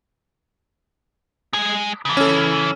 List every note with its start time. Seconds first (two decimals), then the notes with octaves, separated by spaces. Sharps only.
1.53 G#3 G#5
2.05 C#3 E3
2.17 C#4 A4